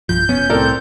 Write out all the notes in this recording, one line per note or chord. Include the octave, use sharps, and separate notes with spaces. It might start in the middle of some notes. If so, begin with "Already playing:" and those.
B1 G2 F3 G6
F1 B3 C#4
C2 A2 C4 A4 A#4 D5